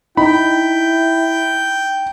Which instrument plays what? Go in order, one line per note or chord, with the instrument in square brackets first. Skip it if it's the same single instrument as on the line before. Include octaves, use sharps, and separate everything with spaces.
[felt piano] D#4 [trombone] E4 [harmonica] G5 [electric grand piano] B5